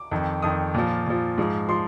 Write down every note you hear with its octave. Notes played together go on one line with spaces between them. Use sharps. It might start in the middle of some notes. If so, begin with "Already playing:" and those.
Already playing: D6
F2 D#3
F2 D#3 D#6
A#2 F3
A#2 F3
G#2 F3
F3 C6